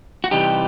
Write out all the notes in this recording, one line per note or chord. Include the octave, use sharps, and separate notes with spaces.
F#4
C3 E3 G3 D#4 G4